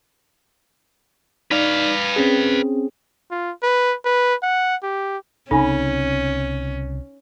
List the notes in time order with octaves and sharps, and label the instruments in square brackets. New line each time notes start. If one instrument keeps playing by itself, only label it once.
[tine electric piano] D#4 D5 [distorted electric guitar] B4 F5
[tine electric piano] C4 C#4 G#4
[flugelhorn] F4
B4
B4
F#5
G4
[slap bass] C2 C#3 C4 [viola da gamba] C#4 [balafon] D#4 [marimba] A4 G#5 B5